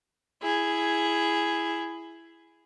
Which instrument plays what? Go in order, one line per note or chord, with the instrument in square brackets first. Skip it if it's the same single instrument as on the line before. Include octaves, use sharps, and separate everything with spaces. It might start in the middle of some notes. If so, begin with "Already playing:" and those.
[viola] E4 G#4